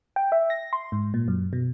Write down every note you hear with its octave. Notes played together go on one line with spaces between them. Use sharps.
G5
E5
A#6
C6
G#2
A#2
F#2
B2